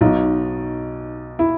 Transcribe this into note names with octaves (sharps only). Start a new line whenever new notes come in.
B1 B2 D#4
E4